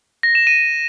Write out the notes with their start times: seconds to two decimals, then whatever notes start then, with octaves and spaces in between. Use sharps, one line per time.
0.23 A#6
0.35 E7
0.47 D#7